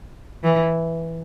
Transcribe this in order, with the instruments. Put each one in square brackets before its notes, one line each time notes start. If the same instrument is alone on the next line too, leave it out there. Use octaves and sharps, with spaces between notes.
[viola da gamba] E3